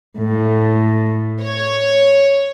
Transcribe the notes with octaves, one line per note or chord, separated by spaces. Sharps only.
A2
C#5